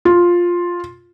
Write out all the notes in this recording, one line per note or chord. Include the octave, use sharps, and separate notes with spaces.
F4